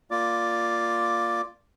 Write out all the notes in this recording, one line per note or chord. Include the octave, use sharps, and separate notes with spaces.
A#3 F4 D5 D6